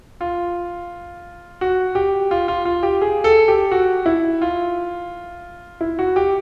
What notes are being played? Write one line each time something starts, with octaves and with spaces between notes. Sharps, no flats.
F4
F#4
G4
F4
F4
F4
G4
G#4
A4
G4
F#4
E4
F4
E4
F#4
G4